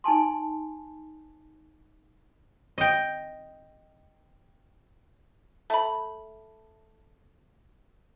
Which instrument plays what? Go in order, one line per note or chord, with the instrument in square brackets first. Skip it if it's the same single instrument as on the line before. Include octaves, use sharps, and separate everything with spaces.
[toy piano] D#4 G#5 A5 C6
[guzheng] D#5 G5
[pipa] A3 B5